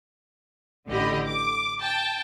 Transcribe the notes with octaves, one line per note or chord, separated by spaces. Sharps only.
A1 D3 G4 D#5 B5
D6
G5 A5